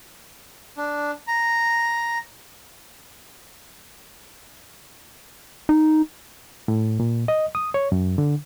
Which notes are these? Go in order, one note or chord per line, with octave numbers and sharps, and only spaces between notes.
D4
A#5
D#4
A2
A#2
D#5
D#6
C#5
F#2
D3